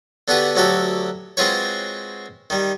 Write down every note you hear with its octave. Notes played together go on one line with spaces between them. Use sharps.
D3 B3 D4 F#4 G4 B4
D2 F#3 F#4 G4 A4
G#3 C4 F4 F#4 B4 C#5
D#3 G3